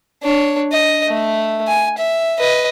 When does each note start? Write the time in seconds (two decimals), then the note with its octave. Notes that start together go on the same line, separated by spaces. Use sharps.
0.23 D4 C#5
0.72 D#5
1.07 A3
1.68 G#5
1.98 E5
2.39 B4 D#5